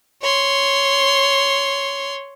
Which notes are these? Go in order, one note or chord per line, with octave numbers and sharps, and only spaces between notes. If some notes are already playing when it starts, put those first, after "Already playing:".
C#5 C6